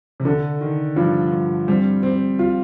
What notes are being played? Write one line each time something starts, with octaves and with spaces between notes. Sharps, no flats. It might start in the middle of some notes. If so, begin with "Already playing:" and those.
C3
D3 A4
D#3
G2 F3
G2
G3 C4
C4
F4